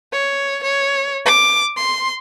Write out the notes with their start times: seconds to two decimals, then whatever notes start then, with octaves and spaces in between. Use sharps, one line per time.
0.12 C#5
0.63 C#5
1.26 D6
1.77 C6